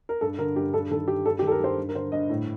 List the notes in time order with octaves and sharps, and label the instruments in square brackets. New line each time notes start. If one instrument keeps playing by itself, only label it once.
[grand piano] A#4
G2 A4
D3 A#4
G2 G4
G2 A4
D#3 A4
G2 G4
G2 A4
G4
D#3 A4
A#4
G2 C5
G2
A#4
D3 C5
G2 D#5
A2